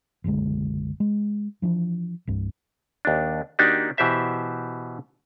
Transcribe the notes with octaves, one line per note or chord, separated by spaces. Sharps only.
F#1 B1 D3 G#3
G#3
E3 F3 D4
C2 G2
D#2 D4
D#3 A#3 D4 D#4 F#4 G4
B2 E3 G4 C5 E5 A#5